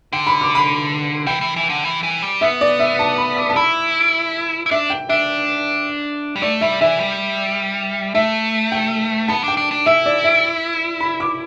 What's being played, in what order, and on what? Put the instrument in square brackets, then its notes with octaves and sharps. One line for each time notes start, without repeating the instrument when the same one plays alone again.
[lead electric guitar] D3 [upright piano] G5
[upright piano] B5
D6
B5
[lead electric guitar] E3 [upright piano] G5
[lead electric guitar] E3
E3
D3
E3
E3
G3
[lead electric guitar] B3 [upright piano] E5
[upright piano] D5
E5
A5
B5
D6
A5
[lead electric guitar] E4 [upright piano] B5
[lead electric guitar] E4
[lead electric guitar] D4 [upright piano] E5
[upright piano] G5
[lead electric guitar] D4 [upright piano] E5
[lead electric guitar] G3
[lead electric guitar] A3 [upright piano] D5
[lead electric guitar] G3 [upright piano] E5
[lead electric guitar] E3 [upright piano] E5
[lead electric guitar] G3
[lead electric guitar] A3 [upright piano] E5
[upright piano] G5
[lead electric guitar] B3 [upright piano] A5
[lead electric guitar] D4 [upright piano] G5
[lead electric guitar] D4
D4
[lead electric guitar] E4 [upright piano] E5
[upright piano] D5
E5
B5
D6